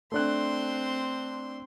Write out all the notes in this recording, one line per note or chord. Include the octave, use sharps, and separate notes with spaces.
A3 C4 D4 C6 F#6